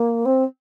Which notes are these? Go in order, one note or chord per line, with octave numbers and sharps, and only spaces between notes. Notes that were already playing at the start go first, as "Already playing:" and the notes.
Already playing: A#3
C4